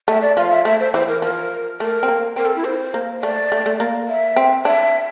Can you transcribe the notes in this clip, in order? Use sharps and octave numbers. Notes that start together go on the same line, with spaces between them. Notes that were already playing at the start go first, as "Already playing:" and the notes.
A3 E5
D5
F3 F5
E5
A3 E5
C5
E3 C5
A#4
F3 A#4
A3 A#4
C4
A#3
C4 A#4
A4
E4
C5
A#3
A3 D5
A3
A3
A#3
E5
C4
D4 E5